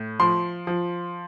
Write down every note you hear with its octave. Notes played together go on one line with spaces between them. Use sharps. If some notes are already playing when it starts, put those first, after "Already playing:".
Already playing: A2
F3 C6
F3